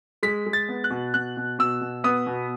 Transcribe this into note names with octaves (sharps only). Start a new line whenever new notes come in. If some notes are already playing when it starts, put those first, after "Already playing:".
G#3 B6
G#3
A6
B3
F#6
B2
B2 F#6
B2
B2 E6
B2
B3 D#6
B2